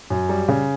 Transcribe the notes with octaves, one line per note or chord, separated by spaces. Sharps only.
F#2
G3
C#3